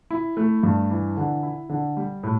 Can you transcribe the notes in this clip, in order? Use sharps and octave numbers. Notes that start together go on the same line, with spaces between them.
E4
A3
G2
E3
D3
E4
D3
G3
A2